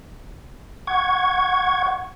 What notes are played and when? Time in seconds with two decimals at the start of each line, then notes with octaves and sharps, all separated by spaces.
0.87 F#5 C#6 G#6